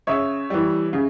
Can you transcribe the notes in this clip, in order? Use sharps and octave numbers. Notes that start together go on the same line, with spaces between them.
C#3 C#5 E5
E3 G3
C#3